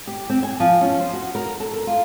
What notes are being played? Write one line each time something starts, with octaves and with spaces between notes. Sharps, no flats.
G4
C4
G#5
F3
C#4
C5
F#4
A#4
A4
A#4
F4